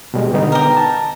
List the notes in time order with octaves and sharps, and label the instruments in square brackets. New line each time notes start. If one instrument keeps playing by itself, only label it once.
[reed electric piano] B2 G3 G#3
D3 B3 D#4
[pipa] G4 A#4
[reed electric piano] A5